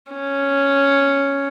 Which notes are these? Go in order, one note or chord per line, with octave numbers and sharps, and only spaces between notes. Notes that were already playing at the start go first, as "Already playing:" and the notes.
C#4